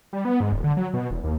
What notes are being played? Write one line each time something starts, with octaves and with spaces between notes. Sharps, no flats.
G3
B3
G#2
D#1
D3
F#3
B2
E1
D#2